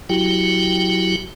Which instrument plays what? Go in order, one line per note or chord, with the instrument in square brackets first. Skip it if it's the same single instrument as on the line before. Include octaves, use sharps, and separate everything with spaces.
[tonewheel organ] F#3 E4 F#4 G4 G5